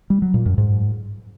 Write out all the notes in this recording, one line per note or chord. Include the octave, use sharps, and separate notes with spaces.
G3
F#3
A#2
F#2
G#2